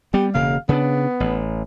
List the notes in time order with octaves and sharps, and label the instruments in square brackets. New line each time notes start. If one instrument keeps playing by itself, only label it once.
[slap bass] G3 B3 [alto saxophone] G4
[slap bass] E1 C#3 A#3 [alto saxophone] F5
[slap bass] C#3 D4 [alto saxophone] B3
[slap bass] A1